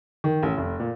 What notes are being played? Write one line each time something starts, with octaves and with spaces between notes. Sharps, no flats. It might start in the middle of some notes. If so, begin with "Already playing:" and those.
D#3
A1
F1
A#2